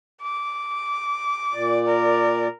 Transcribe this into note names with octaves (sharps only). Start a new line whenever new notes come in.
D6
A#2 D5
A#4